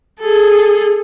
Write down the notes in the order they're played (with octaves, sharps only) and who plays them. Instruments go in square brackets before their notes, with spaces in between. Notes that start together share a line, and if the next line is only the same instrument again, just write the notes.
[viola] G#4 A4